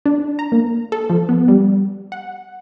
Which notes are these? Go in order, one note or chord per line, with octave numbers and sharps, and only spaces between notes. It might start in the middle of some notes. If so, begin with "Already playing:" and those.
D4
A#5
A#3
A4
F3
B3
G3
F#5